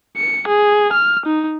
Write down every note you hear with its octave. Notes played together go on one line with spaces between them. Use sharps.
C#7
G#4
F6
D#4